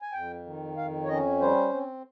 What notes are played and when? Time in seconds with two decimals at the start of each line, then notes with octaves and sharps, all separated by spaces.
0.02 G#5
0.13 F2 G5
0.46 D#3
0.77 F2 F5
1.04 C#5
1.09 C#4 D#5
1.41 G3 C5
1.73 C4